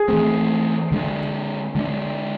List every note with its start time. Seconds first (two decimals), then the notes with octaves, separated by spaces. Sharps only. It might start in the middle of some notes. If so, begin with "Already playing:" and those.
Already playing: G#4
0.08 E3 A3 C4
0.92 D3 G#3 D4
1.75 D3 G#3 D4